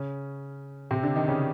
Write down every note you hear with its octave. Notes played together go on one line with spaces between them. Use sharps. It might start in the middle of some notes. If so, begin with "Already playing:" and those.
Already playing: C#3 C#4
C3 C4
D3 D4
D#3 D#4
C#3 C#4